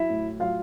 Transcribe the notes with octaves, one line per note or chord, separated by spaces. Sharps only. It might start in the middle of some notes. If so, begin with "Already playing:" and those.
Already playing: F#3 E4 E5
A2
F#3 F4 F5